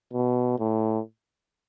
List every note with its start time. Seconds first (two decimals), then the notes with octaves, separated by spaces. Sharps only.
0.13 B2
0.59 A2